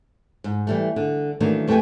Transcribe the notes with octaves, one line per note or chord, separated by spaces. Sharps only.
G#2
E3 G3 A3
D3
D#3 E3 F#3 A3 A#3 D4
F2 A3 G4 B4 G5 G#5